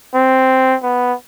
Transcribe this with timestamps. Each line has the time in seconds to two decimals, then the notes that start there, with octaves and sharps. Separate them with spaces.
0.14 C4
0.83 B3